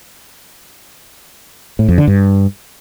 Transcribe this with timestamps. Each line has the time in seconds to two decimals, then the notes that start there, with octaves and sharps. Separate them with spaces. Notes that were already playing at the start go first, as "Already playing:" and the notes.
1.79 A2
1.88 F2
1.98 D3
2.07 G2